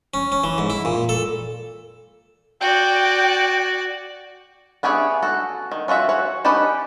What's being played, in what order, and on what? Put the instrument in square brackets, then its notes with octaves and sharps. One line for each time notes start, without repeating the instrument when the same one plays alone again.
[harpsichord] C#4
C#4
E3
G#2
E4
A#2
A4
[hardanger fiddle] F#4 D5 [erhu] G5
[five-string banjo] B3 C#4 G4 G#4 E5
F#4 A4
D#3
C#4 F4 F#4 E5
F#4 C#5
C#4 D#4 G4 B4 A5